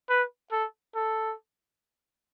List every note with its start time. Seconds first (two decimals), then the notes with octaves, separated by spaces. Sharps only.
0.09 B4
0.52 A4
0.96 A4